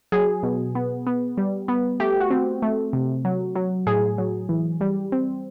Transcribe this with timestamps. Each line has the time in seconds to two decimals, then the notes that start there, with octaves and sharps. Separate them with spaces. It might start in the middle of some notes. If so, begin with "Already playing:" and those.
0.12 F#3 G#4
0.43 B2
0.75 B3
1.07 B3
1.38 G3
1.68 B3
2.00 A3 G4
2.20 F#4
2.31 C4
2.62 A3
2.93 C3
3.25 F#3
3.56 F#3
3.87 A2 G#4
4.18 F#3
4.49 E3
4.81 G3
5.12 C4